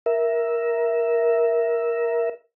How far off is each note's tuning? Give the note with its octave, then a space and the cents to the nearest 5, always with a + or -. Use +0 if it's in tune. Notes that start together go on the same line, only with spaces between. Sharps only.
A#4 +10 E5 +0